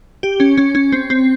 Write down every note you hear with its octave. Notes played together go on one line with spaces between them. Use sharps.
G4
C#4
C#4
C#4
C4
C4